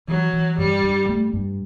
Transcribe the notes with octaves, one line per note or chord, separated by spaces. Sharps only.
E3 F#3
E3
G2 G3
G2
A3
G2